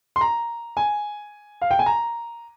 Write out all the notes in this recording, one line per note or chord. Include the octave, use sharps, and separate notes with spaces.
C6
A#5
G#5
F5
G5
G#5
A#5